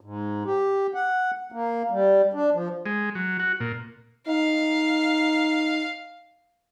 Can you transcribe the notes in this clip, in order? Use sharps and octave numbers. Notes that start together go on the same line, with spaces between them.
G#2
G4
F#5
A#3
G3
D4
F3
G#3
F#3
F#4
A#2
D#4 F5